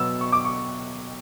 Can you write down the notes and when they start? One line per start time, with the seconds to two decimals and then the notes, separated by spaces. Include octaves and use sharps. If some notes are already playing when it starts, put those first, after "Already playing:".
Already playing: B2 F#3 B3 E6
0.21 C#6
0.32 D6
0.45 C#6